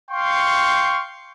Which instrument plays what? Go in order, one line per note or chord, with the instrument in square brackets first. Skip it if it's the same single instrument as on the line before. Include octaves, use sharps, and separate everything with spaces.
[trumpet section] F5 G5 C6 C#6